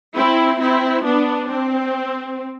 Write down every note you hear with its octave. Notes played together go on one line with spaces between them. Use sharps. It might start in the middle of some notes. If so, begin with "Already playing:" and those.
C4 E4
C4 E4
B3 D4
C4